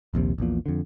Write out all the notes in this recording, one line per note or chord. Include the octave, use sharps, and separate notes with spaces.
D#1 A#1 D#2 C3
A#1 E2 A#2
F2 D3